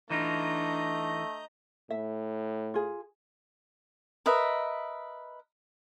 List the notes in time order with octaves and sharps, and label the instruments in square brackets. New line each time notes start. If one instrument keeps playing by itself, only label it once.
[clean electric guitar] E3 D#4 F4 [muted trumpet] A3 [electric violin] D4 [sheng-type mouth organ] D#5 A#5 G6
[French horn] A2 [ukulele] E5
[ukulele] F4 G#4
[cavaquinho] A#4 B4 D#5 E5